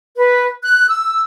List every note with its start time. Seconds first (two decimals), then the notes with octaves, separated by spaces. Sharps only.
0.16 B4
0.62 F#6
0.88 E6